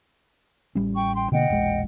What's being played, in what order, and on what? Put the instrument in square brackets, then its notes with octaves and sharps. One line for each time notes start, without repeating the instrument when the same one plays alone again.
[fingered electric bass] A1 G3 C#4
[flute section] G5 C#6
G5 C6
[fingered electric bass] B2 D3 A#3 [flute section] D#5 F#5 G5
[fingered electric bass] E1 A#1 G#3